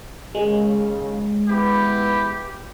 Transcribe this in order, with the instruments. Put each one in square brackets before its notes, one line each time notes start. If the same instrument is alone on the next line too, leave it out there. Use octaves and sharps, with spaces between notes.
[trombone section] D#2 C#3 [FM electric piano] G#3
[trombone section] B3 E4 B4 [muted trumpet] G4